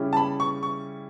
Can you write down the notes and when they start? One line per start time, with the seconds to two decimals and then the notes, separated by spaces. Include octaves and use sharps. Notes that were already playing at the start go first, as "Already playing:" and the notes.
Already playing: C#3 G3 C#4 E4
0.13 A5
0.17 B5
0.40 C#6
0.63 C#6